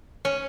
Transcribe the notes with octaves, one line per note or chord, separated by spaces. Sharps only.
C#4